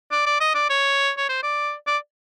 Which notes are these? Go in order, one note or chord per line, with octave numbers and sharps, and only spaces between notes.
D5
D5
D#5
D5
C#5
C#5
C5
D5
D5